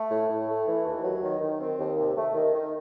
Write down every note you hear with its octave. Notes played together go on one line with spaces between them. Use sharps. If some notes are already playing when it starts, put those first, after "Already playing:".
Already playing: A3
A2
A2
A3
E3
D#2
F#3
D#3
D#3
C4
D#2
C3
A3
D#3
D#3